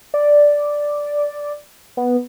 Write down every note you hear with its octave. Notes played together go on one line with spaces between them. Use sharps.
D5
B3